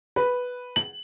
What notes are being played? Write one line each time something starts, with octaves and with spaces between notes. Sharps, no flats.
B4
F#7